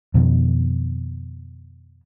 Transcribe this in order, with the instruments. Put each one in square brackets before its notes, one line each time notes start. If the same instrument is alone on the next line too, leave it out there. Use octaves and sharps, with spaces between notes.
[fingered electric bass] F2 B2 D#3